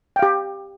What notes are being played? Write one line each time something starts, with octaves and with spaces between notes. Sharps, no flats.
G4 F5 G5